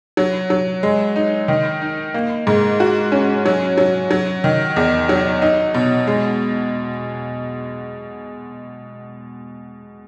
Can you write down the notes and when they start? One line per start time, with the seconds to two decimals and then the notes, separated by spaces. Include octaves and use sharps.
0.17 F#3
0.50 F#3
0.83 G#3
1.16 D#4
1.48 D#3
1.82 D#4
2.14 A#3
2.47 G#2
2.80 F#4
3.12 C#4
3.46 F#3
3.78 F#3
4.11 F#3
4.44 D#3
4.76 E2
5.09 F#3
5.42 D#4
5.74 B2
6.07 G#3